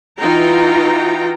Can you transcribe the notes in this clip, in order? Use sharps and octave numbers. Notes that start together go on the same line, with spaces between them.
E3 D#4 F4 F#4 G5 A#5